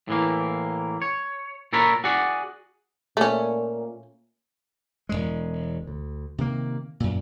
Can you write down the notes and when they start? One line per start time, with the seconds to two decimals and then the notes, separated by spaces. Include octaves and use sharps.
0.08 A2 E3 A#3
1.02 C#5
1.73 A#2 A4 A#4 C#5 A#5 B5
2.04 F#4 G#4 D5 F#5
3.17 A#2 A3 C#4
5.09 E1 C#2 G#3
5.87 D2
6.38 C3 D#3 A#3
7.00 F#2 A#2